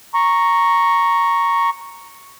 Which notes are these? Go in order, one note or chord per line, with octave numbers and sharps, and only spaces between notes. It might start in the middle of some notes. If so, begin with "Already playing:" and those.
A#5 C#6